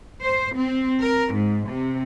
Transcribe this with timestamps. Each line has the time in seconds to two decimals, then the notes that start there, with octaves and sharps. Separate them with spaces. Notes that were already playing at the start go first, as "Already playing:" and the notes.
0.21 C5
0.55 C4
1.01 A#4
1.33 G#2
1.69 C3